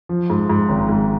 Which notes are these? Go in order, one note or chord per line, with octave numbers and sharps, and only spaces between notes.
F3
G#2
G#2
G#1
G#2